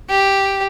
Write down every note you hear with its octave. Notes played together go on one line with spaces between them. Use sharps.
G4